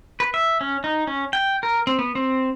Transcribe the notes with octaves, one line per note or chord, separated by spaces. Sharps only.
B4
E5
C#4
D#4
C#4
G5
A#4
C4
B3
C4